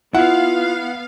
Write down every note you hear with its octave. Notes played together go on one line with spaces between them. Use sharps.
B3 E4 F4 F5 F#5